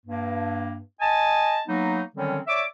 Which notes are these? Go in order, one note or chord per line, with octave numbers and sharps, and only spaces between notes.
G2 A#3
D#5 G#5 A5
F#3 A#3 B3 D#4
D3 D#3 F#3 G3 C4 C#4
C#5 D5 E5 D6